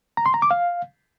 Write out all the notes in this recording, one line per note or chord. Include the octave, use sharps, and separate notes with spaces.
A#5
C6
A#5
D6
F5